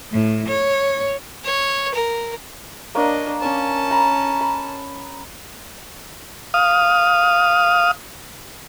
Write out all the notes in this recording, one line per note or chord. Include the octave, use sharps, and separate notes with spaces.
A2
C#5
C#5
A#4
A#3 D4 C#5 D#5
C#4 A5
A#5 B5
B5
F5 D#6